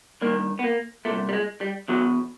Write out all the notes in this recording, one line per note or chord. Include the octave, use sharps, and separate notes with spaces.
G2 D#3 A#3
B3
A#3
C2 A#2 A3
G3
G#3
G3
E2 B2 F#3